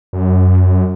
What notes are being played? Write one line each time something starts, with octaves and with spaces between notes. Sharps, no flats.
F#2